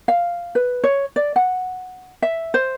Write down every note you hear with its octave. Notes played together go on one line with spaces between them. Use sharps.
F5
B4
C#5
D5
F#5
E5
C5